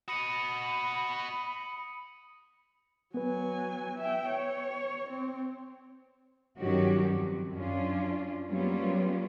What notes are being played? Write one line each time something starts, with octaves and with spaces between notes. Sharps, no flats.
F#4 D#5 B5 D#6 C#7 D#7
F#3 B3 B4 G#5
E5 G5
C#5
C4
G2 D#3 F#3 C#4 F#4 G4
F2
F#2 C#4 D4 F4
F#3 G3 A#3 B3 C#4 F4